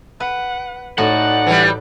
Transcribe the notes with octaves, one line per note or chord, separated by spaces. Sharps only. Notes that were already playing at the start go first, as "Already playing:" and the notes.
B4 F#5
A2 D#4 F#4 D5 F#5
E3 G3